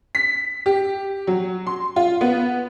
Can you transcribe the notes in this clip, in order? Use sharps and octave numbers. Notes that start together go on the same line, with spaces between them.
B6
G4
F#3
C6
F4
B3